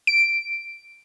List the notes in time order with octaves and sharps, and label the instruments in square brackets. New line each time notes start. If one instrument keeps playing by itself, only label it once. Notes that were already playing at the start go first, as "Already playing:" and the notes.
[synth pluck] D7